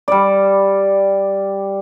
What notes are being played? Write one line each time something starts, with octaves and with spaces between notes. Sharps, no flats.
G3 D5